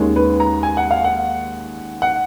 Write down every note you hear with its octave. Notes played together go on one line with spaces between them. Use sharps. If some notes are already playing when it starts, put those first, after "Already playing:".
Already playing: D#2 D#3 G#3 C#4
B4
A#5
G#5
F#5
F5
F#5
F#5